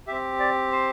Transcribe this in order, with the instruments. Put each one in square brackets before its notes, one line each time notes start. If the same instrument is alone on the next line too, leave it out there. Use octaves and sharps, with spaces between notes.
[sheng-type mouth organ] C4 G4 E5
D5
C5